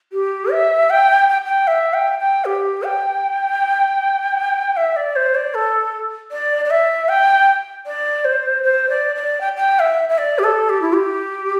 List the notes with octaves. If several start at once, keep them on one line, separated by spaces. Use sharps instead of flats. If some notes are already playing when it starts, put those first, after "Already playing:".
G4
E5
G5
G5
G5
E5
G5
G5
G4
G5
E5
D5
C5
D5
A4
D5
D5
E5
G5
D5
C5
C5
D5
D5
G5
G5
E5
E5
D5
G4
A4
G4
E4
G4